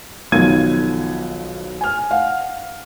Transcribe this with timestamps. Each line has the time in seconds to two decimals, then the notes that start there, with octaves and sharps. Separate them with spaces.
0.32 B1 B2 D#3 F3 G#6 D#7
1.81 G#5 F6
2.11 F5 F#5